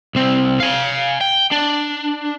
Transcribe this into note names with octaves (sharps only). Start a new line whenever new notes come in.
C2 C4
F5 G#5
G5
D4